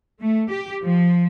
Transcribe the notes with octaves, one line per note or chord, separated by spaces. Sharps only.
A3
G4
F3